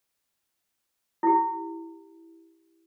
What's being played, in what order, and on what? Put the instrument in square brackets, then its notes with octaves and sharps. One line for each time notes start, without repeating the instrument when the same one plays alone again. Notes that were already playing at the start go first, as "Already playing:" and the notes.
[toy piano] E4 G4